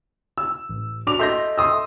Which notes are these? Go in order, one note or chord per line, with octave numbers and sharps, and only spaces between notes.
E6
A1
D4 F#4 D6 F7
A4 D#5 E5 C6 G6 A#6
C6 D#6 E6